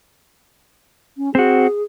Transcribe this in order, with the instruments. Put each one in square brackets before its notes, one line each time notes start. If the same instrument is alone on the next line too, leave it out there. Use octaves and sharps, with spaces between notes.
[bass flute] C#4
[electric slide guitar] C4 F#4 [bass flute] G#4